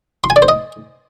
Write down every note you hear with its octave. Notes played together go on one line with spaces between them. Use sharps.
C6
G#5
D5
C5
D#5